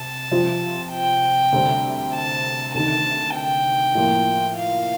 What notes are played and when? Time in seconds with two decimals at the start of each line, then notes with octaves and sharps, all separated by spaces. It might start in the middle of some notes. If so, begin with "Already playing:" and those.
Already playing: C3 A5
0.31 C3 F3 C4 F4
0.91 G5
1.52 D2 C3 G3 C4
2.14 A5
2.73 D2 C3 D#3 A5
3.35 G5
3.95 A2 F3 A#3 F4
4.56 F5